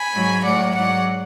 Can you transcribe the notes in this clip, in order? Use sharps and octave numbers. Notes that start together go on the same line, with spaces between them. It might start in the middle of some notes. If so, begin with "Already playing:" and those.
Already playing: G#5 B5
G#2 F#3
A2 F#3 D5 F#5
G#2 F#3 D5 F#5